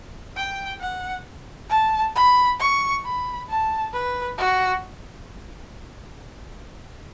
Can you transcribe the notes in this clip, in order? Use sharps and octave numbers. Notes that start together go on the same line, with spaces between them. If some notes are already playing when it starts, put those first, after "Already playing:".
G5
F#5
A5
B5
C#6
B5
A5
B4
F#4